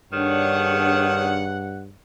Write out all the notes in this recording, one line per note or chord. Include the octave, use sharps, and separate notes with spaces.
G2 D#3 D4 G#4 C#5 F#5